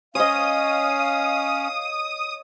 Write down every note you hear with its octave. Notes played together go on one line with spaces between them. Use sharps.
C#4 C#5 D#5 F5 D#6